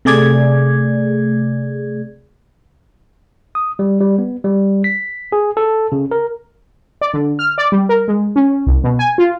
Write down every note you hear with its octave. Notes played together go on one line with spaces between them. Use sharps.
C3 A3 G#4 D5 G#6
D#6
G3
G3
B3
G3
B6
G#4
A4
C#3
A#4
D5
D3
F6
D5
G3
A#4
G#3
C#4
C2
B2
G#5
F4